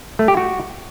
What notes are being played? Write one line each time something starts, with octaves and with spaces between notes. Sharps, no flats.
A3
G4
F#4